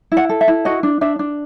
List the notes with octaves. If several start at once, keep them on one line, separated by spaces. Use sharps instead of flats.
E4
F#5
A4
E5
E4
F#4 D#5
D4
D4 E5
D4